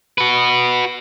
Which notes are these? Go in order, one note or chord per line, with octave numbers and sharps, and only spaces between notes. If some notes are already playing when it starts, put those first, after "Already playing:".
F#4 B4